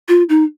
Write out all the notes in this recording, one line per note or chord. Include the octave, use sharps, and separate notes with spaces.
F4
D#4